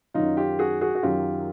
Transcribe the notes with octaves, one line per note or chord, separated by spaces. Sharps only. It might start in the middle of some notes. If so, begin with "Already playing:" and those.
F#2 D#3 F#3 D#4 F4
F4 G4
F#4 G#4
F#4 G#4
F#4
F#2 D#3 F#3 F4 G4